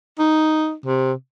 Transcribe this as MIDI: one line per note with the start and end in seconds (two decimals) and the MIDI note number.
0.19 0.73 63
0.86 1.13 48